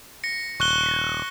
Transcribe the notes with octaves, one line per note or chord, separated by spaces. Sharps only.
A#6 C#7
D#1 C#6 F#6 G7